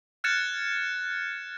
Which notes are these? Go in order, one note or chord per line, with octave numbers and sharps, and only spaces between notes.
F6 F#6 G#6 A6 C#7 E7